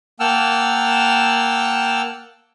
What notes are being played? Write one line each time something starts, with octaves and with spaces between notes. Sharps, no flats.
A#3 F#5 G5 A5 E6 F6